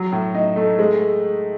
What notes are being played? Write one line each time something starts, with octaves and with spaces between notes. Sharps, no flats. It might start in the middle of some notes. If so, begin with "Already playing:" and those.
Already playing: F#3
A2
D#4
A3
G#3